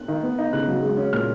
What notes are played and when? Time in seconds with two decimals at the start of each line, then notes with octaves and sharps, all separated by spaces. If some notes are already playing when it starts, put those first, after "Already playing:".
Already playing: F#6
0.08 D#3
0.23 B3
0.38 D#4
0.53 C#3 F#6
0.68 F#3
0.82 G#3
0.97 C#4
1.13 A#2 F6